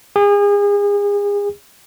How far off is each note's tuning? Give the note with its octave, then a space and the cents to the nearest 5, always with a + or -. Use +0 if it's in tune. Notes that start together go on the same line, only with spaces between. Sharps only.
G#4 -35